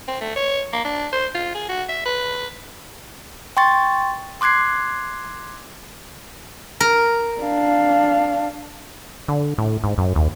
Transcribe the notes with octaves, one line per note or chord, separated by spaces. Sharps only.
C4
A3
C#5
A#3
D4
C5
F4
G#4
F#4
E5
B4
G5 C6 C#6 A6
C6 D6 F#6 G#6 C7
A#4
D4 F5
D3
A2
G#2
F#2
D#2